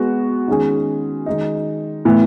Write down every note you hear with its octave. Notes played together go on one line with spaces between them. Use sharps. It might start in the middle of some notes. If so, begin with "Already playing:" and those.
Already playing: G#3 B3 F#4
D#3 G#3 C#4 G#4
D#3 G#3 D#4
A2 E3 B3